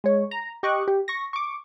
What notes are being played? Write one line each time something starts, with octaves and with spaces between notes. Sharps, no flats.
G#3 C#5
A#5
G4 D#5 C#6 D6 F#6
G4
C#6 A#6
C#6 D6